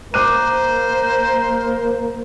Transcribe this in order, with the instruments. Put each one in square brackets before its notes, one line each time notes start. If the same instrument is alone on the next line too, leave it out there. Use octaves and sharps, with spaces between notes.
[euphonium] A#3 [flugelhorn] A#4 [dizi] C5 [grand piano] D6 F#6 D#7